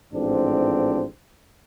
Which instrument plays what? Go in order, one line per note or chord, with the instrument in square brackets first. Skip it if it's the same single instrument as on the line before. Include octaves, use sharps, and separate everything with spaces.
[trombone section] A1 G#2 F3 C4 D4